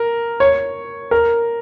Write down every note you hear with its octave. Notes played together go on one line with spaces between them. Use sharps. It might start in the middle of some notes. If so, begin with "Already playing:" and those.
Already playing: A#4
C#5
A#4